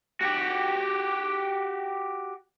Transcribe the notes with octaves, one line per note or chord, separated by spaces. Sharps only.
F#4 G4